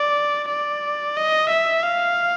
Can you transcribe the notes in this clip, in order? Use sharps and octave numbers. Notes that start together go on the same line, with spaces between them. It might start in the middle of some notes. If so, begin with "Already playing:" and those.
Already playing: D5
D5
D#5
E5
F5